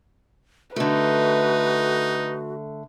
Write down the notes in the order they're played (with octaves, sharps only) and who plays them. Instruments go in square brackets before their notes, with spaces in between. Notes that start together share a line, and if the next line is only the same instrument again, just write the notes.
[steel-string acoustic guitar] D3 A3 [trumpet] D#4 [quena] F#4 [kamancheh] B4